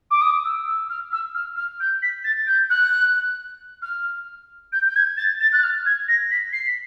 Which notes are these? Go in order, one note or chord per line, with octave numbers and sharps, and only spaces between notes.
D6
D#6
E6
E6
F6
E6
F6
F6
G6
B6
A6
G6
F#6
F6
G6
G6
G#6
A6
A6
F#6
F6
G#6
A#6
B6
C7
B6